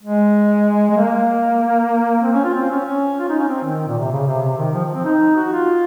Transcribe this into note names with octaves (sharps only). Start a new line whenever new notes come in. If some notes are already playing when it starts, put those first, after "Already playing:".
G#3
G#3
A#3
C4
C#4
F4
C4
C#4
C#4
F4
D#4
C#4
C4
D#3
A#2
C3
C#3
C3
C3
D#3
F3
F3
C4
D#4
F#4
F4